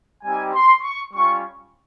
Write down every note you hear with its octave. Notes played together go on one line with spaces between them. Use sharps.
G3 C4 D#4 G4 G#5
C6
C#6
G3 C#4 F4 C#6